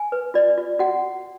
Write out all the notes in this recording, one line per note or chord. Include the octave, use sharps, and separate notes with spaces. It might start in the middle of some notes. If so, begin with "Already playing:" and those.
Already playing: G#5
B4
F4 D5
F4
F#4 F#5